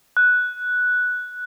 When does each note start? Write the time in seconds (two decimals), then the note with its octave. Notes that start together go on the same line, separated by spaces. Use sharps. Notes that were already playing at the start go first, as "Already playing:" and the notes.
0.17 F#6